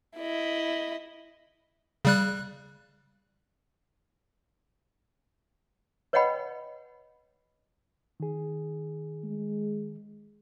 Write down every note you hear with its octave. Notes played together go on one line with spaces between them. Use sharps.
E4 D#5
C#3 G3 F#6
B4 C#5 D#5 F#5 G5 B5
D#3 G#4
G#3